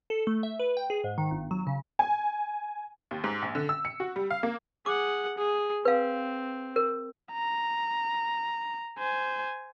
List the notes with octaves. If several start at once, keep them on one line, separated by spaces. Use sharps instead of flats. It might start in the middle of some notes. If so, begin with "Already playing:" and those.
A4
A3
E5
B4
G5
G#4
G#2
D#3
G1
F#3
C#3
G#5
D#2
G#2
A#1
D3
E6
C#7
F#4
G3
F5
A#3
G#4 F#5 D6
G#4
C4 B4 F5
A#4
A#5
C5 G#5